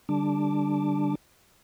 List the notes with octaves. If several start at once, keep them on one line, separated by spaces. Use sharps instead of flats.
D3 G3 D4 A5 D6